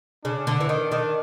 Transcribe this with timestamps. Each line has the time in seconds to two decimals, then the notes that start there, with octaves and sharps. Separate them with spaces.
0.25 C#3 D4
0.47 D3
0.60 E3
0.69 D#3
0.92 D#3